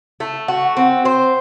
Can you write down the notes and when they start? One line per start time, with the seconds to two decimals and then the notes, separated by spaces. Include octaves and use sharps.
0.20 A3
0.48 F#4
0.77 C4
1.05 C5